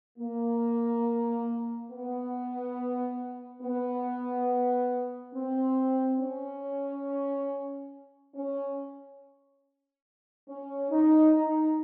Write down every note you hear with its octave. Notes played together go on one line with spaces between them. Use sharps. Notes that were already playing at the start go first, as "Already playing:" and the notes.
A#3
B3
B3
C4
C#4
C#4
C#4
D#4
D#4